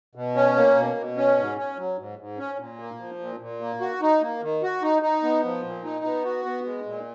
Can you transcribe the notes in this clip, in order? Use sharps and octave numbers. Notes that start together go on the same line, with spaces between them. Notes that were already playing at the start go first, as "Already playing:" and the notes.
B2
C#4
A#3
B2
B2
C#4
G#2
C#4
F#3
G#2
G#2
C#4
A#2
A#3
F3
A#2
A#2
A#3
F#4
D#4
A#3
D#3
F#4
D#4
D#4
B3
F3
A#2
D#4
B3
F#4
B3
G#3
A#2